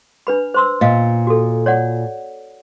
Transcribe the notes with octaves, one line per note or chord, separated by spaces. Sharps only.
D4 B4 B5
C5 C6 E6
A#2 D#5 F5
F#4 A4
C#5 D5 F#5